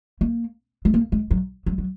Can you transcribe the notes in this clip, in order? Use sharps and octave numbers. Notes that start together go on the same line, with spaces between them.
A#3
G#3
A#3
G#3
F#3
F#3
F#3